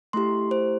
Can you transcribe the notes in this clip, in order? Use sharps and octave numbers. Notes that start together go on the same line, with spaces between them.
A3 E4 G4 C6
C5